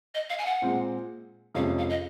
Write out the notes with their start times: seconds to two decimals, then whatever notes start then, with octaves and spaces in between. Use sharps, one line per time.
0.15 D#5
0.30 F5
0.39 G#5
0.46 F#5
0.62 A#2 G#3 C4
1.55 F2 C3 F3 G#3 C#4 F5
1.79 F5
1.90 D#5